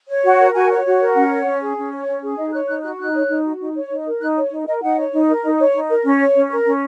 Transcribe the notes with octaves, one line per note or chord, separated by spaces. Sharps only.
C#5
F#4
A#4
F#4 G#5
C#5
F#4
A#4
C#4 F#5
C#5
C#4
G#4
C#4
C#5
C#4
G#4
D#4 D#5
C#5 F#6
D#4 F#6
F#4 F#6
D#4 F#6
C#5
D#4
F#4
D#4
C#5
D#4
A#4
D#4 F#6
C#5
D#4
A#4 D#5
D#4 F#5
C#5
D#4
A#4
D#4
C#5
D#4
A#4
C#4
C#5
C#4
A#4
C#4